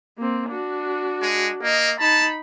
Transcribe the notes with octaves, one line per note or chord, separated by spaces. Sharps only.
A#3 C4
D4 F#4
G#3
A#3 D#5
D#4 A5 B5